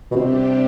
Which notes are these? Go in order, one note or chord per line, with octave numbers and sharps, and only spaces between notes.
B2
C3 G3 D4 G4